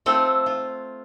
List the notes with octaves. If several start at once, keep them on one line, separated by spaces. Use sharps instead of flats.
A3 C4 F4 A4
F4